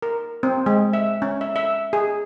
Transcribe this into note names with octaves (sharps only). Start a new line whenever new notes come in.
A#4
C4
G#3
E5
C#4
E5
E5
G#4